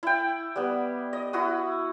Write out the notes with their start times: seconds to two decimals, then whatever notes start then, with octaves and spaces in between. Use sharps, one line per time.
0.03 E4 G5
0.56 G3 B3
1.13 D#5
1.33 E4 F#4 D#6